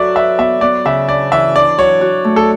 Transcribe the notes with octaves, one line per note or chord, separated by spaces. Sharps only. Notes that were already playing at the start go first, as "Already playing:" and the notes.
Already playing: F#3 F#4 A4 D5 E5
B4 E5
B3 E5
B3 D5
C#3 E5
D4 D5
E3 E5
D4 D5
F#3 C#5
F#4
A3
A4